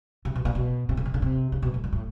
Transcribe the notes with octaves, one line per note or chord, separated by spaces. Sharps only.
C3
B2
A#2
B2
C3
C#3
C3
C#3
C3
C#3
B2
A2
A#2
A2